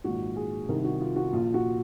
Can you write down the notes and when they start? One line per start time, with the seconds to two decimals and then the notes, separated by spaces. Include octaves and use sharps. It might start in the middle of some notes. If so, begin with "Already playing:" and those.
0.04 A#1 G#2 D#3 F#4
0.36 G#4
0.68 C2 C3 D#3 A#4
0.84 F#4
1.01 F4
1.16 F#4
1.33 A#1 A#2 F4
1.54 F#4